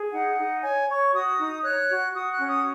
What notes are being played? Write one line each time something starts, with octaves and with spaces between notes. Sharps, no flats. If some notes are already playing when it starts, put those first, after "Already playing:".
Already playing: G#4
D#4 F#5
D#4
C#5 G#5
C#5 C#6
F#4 D#6
D#4
C#5 F#6
F#4
F#4 D#6
F#6
C#4
D#6